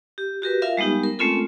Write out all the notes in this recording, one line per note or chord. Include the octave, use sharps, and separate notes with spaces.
G4
F#4 G4 A#4 B4
F4 A#4 E5 F5
G3 G#3 B3 D#4 G4
A#4
G#3 A3 C4 C#4 F4 A4